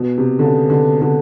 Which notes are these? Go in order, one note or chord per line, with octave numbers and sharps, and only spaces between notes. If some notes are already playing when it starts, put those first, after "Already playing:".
Already playing: B2
C3
D3
C#3
D3
D3